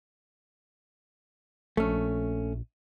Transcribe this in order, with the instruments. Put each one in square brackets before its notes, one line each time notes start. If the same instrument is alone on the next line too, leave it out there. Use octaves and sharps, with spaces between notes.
[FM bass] A#1 [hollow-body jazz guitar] A3 C#4